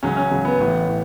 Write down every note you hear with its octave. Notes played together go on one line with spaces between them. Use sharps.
C#2 C#3 F#3 C#4
C#4
C#2 C#3 F#3
B3
A1 A2 E3
A2